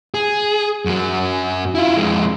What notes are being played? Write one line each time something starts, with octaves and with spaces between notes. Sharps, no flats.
G#4
F#2 F#3
E4 F4
F2 G#3